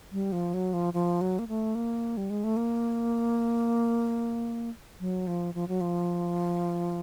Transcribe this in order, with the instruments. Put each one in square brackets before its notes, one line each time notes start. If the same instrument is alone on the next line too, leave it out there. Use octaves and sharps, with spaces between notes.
[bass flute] G3
F3
F#3
F3
F3
F#3
A#3
A3
A#3
G3
G#3
A3
A#3
F#3
F3
F3
F#3
F3